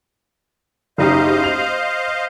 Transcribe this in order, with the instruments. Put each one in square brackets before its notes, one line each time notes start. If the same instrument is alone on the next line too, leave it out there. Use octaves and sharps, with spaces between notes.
[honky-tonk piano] F#1 D#4 G4 [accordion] C5 D#5 F5
[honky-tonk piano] F7